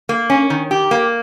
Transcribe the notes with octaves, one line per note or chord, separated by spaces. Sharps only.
A#3
C#4
D#3
G4
A#3